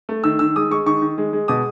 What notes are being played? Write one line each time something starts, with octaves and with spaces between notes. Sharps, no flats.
A3
D#3 E6
D#3 E6
G#3 D#6
G#3 C#6
D#3 C#6
D#3
G#3
G#3
B2 D#6